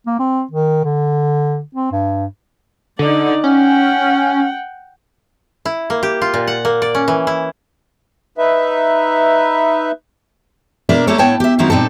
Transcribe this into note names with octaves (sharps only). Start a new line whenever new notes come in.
A#3
C4
D#3
D3
C4
G2
D3 D#4 D5
C#4 F#5 G5
E4
A#3
G4
F4
A#2
F#5
A#3
D5
C#4
E3
E4
D#4 B4 E5
B2 A#3 D4 A#4 D5 E5
G3 A3 A#3 A4 C#5
A2 B3 E4 C#5 G5 A5
G4 E5
D#3 F#3 A#3 C4 D#4 E4
A#2 G3 C4 D#4 A4